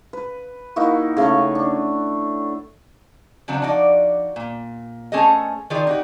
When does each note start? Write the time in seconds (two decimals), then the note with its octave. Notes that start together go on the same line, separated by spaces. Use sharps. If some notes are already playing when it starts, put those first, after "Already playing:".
0.13 B4
0.76 A#3 D#4 E4 F#4
1.17 C#3 A3 C#5 C#6
1.55 D4
3.48 C#3 F#3 C4 D4
3.62 F3 D#4 F#4 D5
4.36 A#2
5.12 A3 C#4 G#4 A4 C5 D#5
5.70 D#3 F4 G#4 A#4 D5
5.87 D#4 F#4 G4